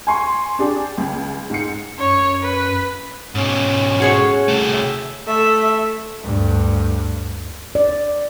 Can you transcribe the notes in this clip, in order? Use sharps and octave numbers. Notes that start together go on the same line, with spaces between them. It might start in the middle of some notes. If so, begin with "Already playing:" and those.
G#5 C6 C#6
D4 G4 G#4
C#2
G#2 C#7
F#2 C#5
B4
G#2 B2 C#4
F#4 G#4 C#5
C2 A3
E5
A3 E5
D2 G2
D5